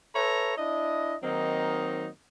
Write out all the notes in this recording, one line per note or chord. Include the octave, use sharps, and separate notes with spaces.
A4 B4 C#5 E5 A#5
D4 E4 D#5
D#3 F#3 A#3 C4 D#4